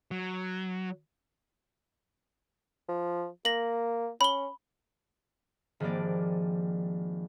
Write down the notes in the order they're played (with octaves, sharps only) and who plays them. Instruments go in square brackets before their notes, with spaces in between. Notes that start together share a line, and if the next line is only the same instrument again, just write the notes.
[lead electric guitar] F#3
[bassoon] F3
[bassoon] A#3 [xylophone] A#6 F#7
[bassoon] C#4 [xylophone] B5 G7
[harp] G#1 F3 G3 A#3 D5